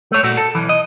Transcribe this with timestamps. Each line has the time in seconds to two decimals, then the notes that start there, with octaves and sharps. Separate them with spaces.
0.12 A3 C#5
0.23 A#2 A3 F#4
0.37 A4
0.55 B1 E3
0.69 D#5